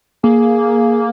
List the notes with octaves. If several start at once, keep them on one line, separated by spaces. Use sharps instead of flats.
A#3 G#4